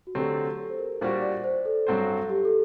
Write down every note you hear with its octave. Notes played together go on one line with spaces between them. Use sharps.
F#4
D3 F#3 A3 C4 G4
A4
C5
A#4
A#2 G3 D4 F#4 C5
D5
C5
A4
G2 F#3 C4 F#4 C5
G4
A4